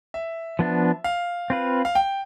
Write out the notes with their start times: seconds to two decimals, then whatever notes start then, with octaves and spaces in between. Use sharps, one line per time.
0.14 E5
0.59 F3 B3 D4
1.04 F5
1.50 C4 F4 B4
1.85 F5
1.95 G5